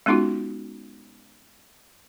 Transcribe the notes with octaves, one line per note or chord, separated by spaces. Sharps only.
G#3 B3 C#4 D#4 F4 F#4